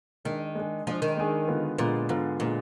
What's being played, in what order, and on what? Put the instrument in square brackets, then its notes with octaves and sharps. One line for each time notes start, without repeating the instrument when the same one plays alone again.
[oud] D#3 [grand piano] G#3 D4 G#4
[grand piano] G#3 D4 G#4
[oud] F3 [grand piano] G#3 D4 G#4
[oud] D#3
[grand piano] G#3 D4 G#4
D3 G#3 B3 F4
[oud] A#2 [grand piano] D3 G#3 B3 F4
[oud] G#2 [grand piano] D3 G#3 B3 F4
[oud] A#2 [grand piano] D3 G#3 B3 F4